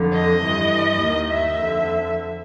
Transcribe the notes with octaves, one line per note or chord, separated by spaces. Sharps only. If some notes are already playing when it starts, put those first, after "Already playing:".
Already playing: F2 D3
D#5
G2 E3
D#2 D#3
E5
F2 D3